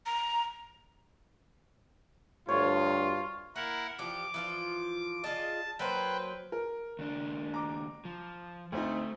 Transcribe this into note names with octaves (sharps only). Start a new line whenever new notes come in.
A#5
D2 G2 F4 C#5
A#3 E4 A#4 F#5
E3 F3 G4 D6
E3 F3 F4
F4 G#4 D#5 A5
F#3 A#3 B4 C5 G5
A#4
D#2 D4
A#5 D6
F3
D2 A3 C4 D#4